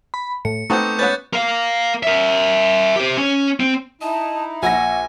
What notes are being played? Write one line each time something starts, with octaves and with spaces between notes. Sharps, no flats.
B5
A2 C#7
A3 B3 C4 D#4 C#6 D6 G6
B3 C#4 B4 F#6 G6 A6
A#4 F5
A#4 E5
G4 C5
C#4
C4
D#4 E4 D#5 A5
A#1 F#5 G#5 E6 A#6